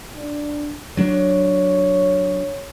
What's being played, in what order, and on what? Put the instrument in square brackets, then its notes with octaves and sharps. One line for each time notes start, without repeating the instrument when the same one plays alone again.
[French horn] D4
[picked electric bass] F#3 D4 [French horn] C#5